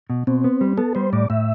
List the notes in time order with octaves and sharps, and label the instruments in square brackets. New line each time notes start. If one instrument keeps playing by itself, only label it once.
[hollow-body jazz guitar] B2
[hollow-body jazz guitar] B2 [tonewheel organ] C4
[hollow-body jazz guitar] B3
G3
[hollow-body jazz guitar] B3 [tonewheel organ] A4
[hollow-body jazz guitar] G3 [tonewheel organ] C5
[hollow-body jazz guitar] A2 [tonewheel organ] D5
[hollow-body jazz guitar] A2 [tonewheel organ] E5